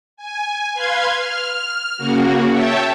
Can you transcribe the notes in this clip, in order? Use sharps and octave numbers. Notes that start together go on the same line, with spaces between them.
G#5
B4 F5 C6 G#6
F6
C#3 A#3 F#4
C#5 E5 G5 A5